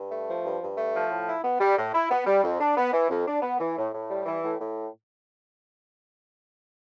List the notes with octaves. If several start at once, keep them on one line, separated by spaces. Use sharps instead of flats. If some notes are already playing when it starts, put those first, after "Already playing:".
Already playing: G2
A3
F3
G2
G2
A3
F3
A2
E4
B3
G3
A2
E4
B3
G3
F2
D4
B3
E3
F2
D4
B3
E3
A2
A2
G3
E3
A2
A2